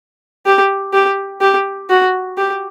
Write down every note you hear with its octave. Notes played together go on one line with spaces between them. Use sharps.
G4
G4
G4
F#4
G4